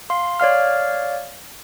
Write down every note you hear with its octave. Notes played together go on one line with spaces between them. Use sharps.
F5 C6
C#5 D5 F5 F6